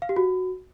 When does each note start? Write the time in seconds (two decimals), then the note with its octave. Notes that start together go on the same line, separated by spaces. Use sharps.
0.02 F5
0.09 G4
0.16 F#4